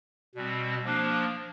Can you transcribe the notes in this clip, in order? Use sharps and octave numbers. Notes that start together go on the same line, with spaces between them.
B2 G3 C4
F3 A#3 D4